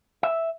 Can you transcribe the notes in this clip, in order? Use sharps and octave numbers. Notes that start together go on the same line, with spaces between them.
E5